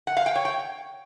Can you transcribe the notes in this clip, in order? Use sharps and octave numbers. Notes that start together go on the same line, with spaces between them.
F#5
F5
G5
C#5
G5